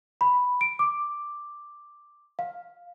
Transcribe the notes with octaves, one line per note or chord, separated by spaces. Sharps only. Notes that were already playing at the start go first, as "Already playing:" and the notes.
B5
D7
D6
F5